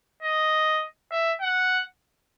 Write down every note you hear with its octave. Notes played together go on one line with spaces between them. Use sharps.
D#5
E5
F#5